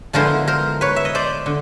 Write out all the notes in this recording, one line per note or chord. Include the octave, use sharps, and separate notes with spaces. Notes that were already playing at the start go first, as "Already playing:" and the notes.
D3 F3 G#3 B3 E4 A#4 C5
A#4 C5
B4 C#5
E5
D#5
C5 D5
D3